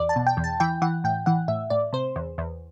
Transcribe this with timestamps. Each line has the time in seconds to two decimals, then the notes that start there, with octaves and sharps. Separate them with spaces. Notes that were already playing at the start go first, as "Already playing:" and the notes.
Already playing: E2 D5
0.09 A5
0.16 B2
0.27 G5
0.37 E2
0.44 A5
0.60 E3 G5
0.82 E3 F#5
1.04 A2 G5
1.26 E3 F#5
1.48 A2 E5
1.70 A2 D5
1.93 C3 C5
2.16 E2
2.38 E2